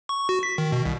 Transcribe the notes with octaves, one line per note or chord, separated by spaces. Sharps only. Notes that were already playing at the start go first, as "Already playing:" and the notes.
C#6
F#4
B6
D#3
B2
C2